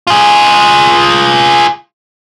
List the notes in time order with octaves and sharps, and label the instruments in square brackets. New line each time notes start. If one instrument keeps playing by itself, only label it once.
[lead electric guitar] F4 G#4